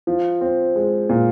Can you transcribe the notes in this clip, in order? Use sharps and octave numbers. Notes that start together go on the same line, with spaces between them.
F3
C4
G#3
A#2